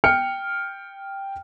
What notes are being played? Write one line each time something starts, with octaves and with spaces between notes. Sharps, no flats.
G5 F6 C#7